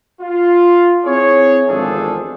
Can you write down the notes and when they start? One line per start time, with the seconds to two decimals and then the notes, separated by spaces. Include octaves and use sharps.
0.21 F4
1.05 C4 E4 G#4 C#5
1.68 G#1 E2 F3 D4 G#4 A4